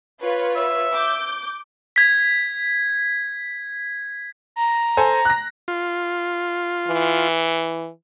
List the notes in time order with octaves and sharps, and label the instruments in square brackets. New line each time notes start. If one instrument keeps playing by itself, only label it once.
[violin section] F4 B4 C#5
[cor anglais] E5
[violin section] D6 G6
[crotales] G#6 B6
[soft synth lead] A#5
[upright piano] A4 C5 G#5
F#6 A#6
[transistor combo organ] F4
[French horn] E3